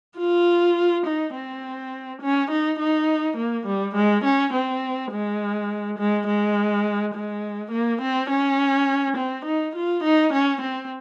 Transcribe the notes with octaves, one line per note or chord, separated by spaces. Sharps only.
F4
D#4
C4
C#4
D#4
D#4
A#3
G3
G#3
C#4
C4
G#3
G#3
G#3
G#3
A#3
C4
C#4
C4
D#4
F4
D#4
C#4
C4